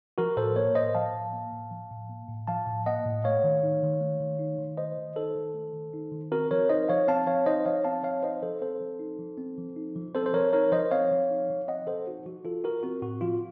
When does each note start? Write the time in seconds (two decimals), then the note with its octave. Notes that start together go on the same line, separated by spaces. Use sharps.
0.18 F3 F#4 A#4
0.37 A2 A4 C5
0.56 A#3 A#4 C#5
0.75 A2 C5 D#5
0.95 F3 F5 A5
1.14 A2
1.33 A#3
1.52 A2
1.71 F3
1.91 A2
2.09 A#3
2.29 A2
2.48 F3 F5 A5
2.67 A2
2.86 A#3 D#5 F#5
3.06 A2
3.24 A3 C#5 F5
3.44 D#3
3.63 D#4
3.83 D#3
4.01 A3
4.20 D#3
4.39 D#4
4.59 D#3
4.78 A3 C5 D#5
4.97 D#3
5.16 D#4 A4 C5
5.35 D#3
5.54 A3
5.73 D#3
5.94 D#4
6.12 D#3
6.32 C4 F#4 A#4
6.51 F3 A#4 C#5
6.69 D#4 C5 D#5
6.89 F3 C#5 F5
7.08 C4 F5 A5
7.27 F3 C#5 F5
7.46 D#4 C5 D#5
7.65 F3 C#5 F5
7.84 C4 F5 A5
8.04 F3 C#5 F5
8.23 D#4 C5 D#5
8.43 F3 A4 C5
8.62 C4 A4 C5
8.80 F3
8.99 D#4
9.19 F3
9.38 C4
9.58 F3
9.76 D#4
9.96 F3
10.15 C4 A4 C5
10.26 C5
10.34 F3 A#4 C#5
10.53 D#4 A#4 C#5
10.72 F3 C5 D#5
10.91 C4 C#5 F5
11.11 F3
11.31 D#4
11.50 F3
11.68 C4 D#5 F#5
11.87 F3 A4 C5
12.06 D#4 F#4
12.26 F3 F#4
12.45 F3 F4 A4
12.64 F4 F#4 A#4
12.83 C4 F#4
13.02 A2 F#4
13.21 F3 F4